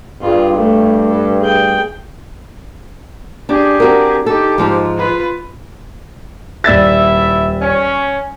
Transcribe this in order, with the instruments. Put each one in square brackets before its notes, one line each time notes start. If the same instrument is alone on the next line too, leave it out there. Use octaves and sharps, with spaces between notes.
[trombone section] G2 [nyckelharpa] F4 G#4
[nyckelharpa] A3
A4
G#4 G5
[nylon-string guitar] D4 [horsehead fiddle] G4 G#4
[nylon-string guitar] C4 F#4 A#4
[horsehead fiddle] D#4 G4 [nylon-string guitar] A4
[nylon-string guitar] G#2 F3 G#3
[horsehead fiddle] F4 B4
[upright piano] D#1 D5 A6 [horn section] E4 E5
[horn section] C#4